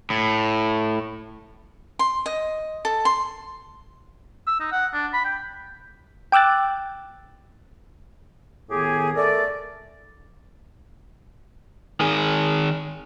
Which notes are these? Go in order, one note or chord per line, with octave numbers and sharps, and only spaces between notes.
A2
C6
D#5
A4
C6
E6
D#4
F#5
D4
B5
G5
G5 D6 E6 F#6 A6
A2 D#3 B3 G4 G#4
A3 A4 A#4 D5
D#3 G#4